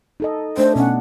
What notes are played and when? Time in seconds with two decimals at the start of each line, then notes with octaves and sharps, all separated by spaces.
0.20 D#4 A4 D#5
0.58 A3 D4 C5
0.76 B2 C#4 F#5